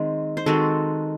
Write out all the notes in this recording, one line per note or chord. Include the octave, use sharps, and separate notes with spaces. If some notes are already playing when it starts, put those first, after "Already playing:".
Already playing: D#3 G#3 C4
C5
D#3 G#3 C4 F#4 A4